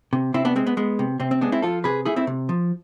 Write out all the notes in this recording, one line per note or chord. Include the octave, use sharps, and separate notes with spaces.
C3
C3 C4 E4
B3 D4
G#3 C4
B3
G#3 B3
C3
C3 C4
C4
G#3 B3 D4
C4 E4
F3 F4 A4
C3 G#4 B4
A3 E4 G#4
C4 E4
C3
F3